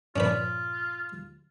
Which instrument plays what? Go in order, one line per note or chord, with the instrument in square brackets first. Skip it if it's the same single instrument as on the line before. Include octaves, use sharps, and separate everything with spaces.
[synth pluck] G2 A#2 F3 [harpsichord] C#4 D4 B4 [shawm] F4